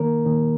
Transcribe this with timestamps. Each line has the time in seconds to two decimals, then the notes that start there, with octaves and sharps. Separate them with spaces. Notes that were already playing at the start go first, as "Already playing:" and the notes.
Already playing: D#3 A#3 A#4
0.25 D#3 A#3